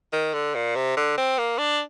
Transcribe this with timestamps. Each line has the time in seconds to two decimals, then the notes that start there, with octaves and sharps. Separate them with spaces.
0.13 D#3
0.34 D3
0.55 A#2
0.75 C3
0.97 D3
1.17 C4
1.38 A#3
1.58 D4